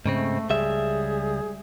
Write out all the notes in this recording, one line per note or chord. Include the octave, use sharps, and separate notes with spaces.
G#2 C#3 A3 C4
C#2 G3 G#4 E5